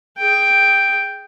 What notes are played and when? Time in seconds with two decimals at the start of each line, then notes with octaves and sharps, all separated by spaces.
0.19 G#4 G5